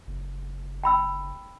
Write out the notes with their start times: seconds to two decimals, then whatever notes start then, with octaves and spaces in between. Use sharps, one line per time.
0.07 F#1
0.84 G5 B5 E6